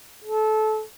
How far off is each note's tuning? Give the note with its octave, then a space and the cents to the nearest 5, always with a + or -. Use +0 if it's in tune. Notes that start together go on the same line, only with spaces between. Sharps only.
A4 -20